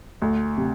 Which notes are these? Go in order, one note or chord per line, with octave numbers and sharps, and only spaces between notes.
D2
C3